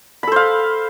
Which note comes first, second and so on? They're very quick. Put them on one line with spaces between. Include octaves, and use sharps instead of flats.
B5 A4 C5 F5